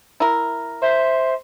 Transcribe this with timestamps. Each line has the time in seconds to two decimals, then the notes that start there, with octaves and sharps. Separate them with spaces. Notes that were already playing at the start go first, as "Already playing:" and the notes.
0.20 E4 A#4
0.82 C5 E5